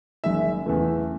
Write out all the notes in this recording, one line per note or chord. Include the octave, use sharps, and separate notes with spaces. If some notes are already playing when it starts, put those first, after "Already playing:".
F#1 F#2 D#3 G#3 E5
E2 C#3 E3 A3